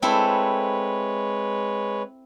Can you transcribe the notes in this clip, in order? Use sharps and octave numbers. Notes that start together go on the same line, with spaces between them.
G#3 C4 E4 A4 B4 C#5